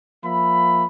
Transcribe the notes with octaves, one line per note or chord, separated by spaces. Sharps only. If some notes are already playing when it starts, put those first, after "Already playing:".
F3 A#3 E5 B5